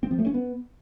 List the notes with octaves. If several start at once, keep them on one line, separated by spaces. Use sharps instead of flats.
C4
F3
A3
C#4
B3